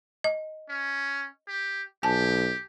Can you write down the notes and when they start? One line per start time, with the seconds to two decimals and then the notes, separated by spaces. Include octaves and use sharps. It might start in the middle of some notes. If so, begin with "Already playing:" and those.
0.24 D#5
0.69 C#4
1.47 G4
2.03 B1 G4 G#5 A5